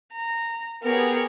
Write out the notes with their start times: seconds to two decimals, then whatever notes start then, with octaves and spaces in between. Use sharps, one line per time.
0.13 A#5
0.83 B3 G4 G#4 A#4 C#5